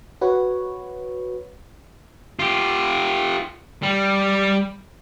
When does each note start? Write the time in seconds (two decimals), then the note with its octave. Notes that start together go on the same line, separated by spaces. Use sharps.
0.21 F#4 B4 C#5
2.39 F4 G4
3.83 G3